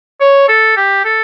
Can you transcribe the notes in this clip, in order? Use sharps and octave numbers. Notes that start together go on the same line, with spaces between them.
C#5
A4
G4
A4